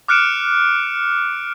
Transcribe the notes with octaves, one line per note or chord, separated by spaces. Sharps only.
D6 F6 F#6 C#7 D7 E7